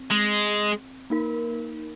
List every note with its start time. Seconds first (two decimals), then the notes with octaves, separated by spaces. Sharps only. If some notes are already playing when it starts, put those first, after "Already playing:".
Already playing: C4
0.10 G#3
1.10 A#3 D#4 A#4